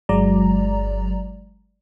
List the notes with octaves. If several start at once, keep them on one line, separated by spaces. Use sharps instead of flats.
G1 F#3 G#3 D5 A#5